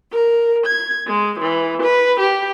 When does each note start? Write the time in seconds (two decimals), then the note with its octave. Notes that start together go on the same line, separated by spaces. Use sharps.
0.12 A#4
0.66 G#6
1.06 G#3
1.40 E3
1.82 B4
2.21 G4